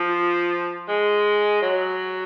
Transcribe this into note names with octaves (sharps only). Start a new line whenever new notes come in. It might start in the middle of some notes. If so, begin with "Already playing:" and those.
Already playing: F3
G#3
F#3